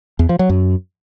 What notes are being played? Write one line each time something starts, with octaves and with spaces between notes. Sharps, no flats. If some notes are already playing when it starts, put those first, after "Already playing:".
E2
F3
F#3
F#2